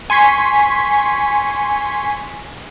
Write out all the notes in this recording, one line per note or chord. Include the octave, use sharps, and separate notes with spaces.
G#5 C6 C#6 B6